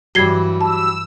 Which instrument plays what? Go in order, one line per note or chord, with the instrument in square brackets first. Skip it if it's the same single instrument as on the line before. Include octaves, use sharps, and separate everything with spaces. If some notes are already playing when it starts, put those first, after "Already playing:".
[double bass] G2 E3 [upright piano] F#3 G3 [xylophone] G#6 C7 G7
[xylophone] A5 [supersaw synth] E6